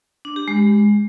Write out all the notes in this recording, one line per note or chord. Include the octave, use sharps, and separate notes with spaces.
D4
G4
G#3